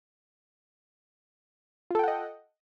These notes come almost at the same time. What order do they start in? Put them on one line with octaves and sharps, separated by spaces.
F4 A4 G5 F#5 D#5